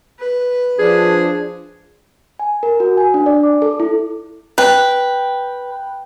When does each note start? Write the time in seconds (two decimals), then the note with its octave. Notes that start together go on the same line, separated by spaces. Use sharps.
0.19 B4
0.79 F3 D4 G#4
2.39 G#5
2.63 A#4
2.80 F#4
2.97 G#5
3.14 D4
3.26 D5
3.43 D6
3.62 A4
3.80 E4
4.58 B4 G5